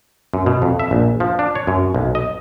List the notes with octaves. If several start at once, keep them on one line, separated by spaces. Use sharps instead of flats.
F#2
B2
F2
E5
A#1
F3
D4
C#5
F#2
B1
D#5